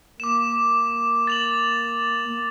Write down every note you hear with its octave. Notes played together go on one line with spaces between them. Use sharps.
A#3 D6 E7
A6 F7 F#7